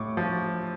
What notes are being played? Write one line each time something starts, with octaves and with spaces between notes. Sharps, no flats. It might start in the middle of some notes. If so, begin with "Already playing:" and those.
Already playing: A2 C#6 D6
F3